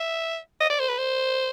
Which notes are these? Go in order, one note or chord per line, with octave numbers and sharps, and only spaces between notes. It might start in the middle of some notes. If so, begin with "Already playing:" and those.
Already playing: E5
D#5
D5
C5
B4
C5